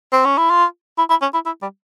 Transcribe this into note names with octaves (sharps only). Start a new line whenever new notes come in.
C4
C#4
E4
F4
E4
E4
C#4
E4
E4
G3